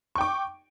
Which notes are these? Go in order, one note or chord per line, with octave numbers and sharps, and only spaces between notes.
G5 C#6 D6